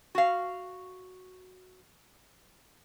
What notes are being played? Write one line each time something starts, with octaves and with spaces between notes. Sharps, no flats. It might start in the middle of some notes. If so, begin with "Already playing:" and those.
F#4 F5